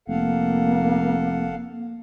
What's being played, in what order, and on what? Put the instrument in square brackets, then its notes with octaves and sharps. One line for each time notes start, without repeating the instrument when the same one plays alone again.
[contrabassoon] F1 [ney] A#3 [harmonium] A4 F5 F#5